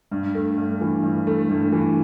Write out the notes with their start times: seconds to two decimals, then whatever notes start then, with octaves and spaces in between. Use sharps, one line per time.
0.12 G2
0.35 A3
0.57 G2
0.81 E3
1.03 G2
1.27 A3
1.49 G2
1.72 E3